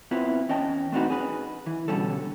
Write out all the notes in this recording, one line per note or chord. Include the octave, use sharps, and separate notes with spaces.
B3 C4 E4 F4 B4 C#5
E2 C#4 D#5 G5 A5
A3 C4 D4 D#4 F#4 B4
G#4 B4
E3
B2 D3 G3 C#4 A4